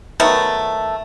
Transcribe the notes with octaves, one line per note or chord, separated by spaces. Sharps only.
D#3 F#3 A3 B3